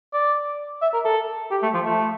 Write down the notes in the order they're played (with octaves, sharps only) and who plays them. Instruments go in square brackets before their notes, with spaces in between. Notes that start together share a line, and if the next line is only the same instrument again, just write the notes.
[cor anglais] D5
E5
A#4
A4
G4
A3
F3
A3